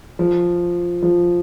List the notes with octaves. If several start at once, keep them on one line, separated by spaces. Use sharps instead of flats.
F3
F3